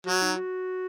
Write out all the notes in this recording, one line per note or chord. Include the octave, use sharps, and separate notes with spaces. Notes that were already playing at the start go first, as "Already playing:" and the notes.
F#3 F#4
D#4
F#4